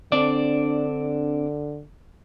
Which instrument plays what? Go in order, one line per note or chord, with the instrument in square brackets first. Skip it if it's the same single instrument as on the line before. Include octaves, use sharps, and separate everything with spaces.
[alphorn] D3 [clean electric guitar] C4 D4 D5